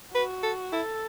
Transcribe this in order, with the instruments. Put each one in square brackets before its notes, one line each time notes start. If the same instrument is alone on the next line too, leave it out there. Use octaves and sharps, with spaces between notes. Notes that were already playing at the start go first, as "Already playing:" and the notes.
[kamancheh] F#4 [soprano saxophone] B4
[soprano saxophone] A4
[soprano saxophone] E4 [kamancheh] A4